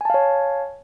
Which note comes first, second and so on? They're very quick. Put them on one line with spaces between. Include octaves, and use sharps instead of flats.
G#5 A5 F5 C#5